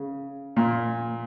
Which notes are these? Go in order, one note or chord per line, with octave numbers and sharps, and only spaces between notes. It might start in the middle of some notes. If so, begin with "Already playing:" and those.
Already playing: C#3
A#2